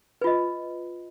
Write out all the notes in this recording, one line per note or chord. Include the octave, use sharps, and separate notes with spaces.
F4 B4 D#5